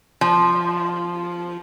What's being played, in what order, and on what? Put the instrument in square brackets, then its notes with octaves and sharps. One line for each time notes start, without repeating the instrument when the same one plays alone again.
[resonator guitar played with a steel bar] F3